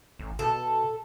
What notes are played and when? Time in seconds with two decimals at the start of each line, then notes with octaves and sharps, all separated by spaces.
0.19 A1
0.39 B2 A4